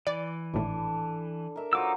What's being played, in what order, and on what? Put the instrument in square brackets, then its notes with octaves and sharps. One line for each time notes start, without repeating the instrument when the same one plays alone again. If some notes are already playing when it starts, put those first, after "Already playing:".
[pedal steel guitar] E3 [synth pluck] D5
[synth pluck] G#1 A2 [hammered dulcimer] D4 A4
[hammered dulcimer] A#4 E5
[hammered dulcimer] F#3 F4 C5 [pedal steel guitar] D#4 D6 E6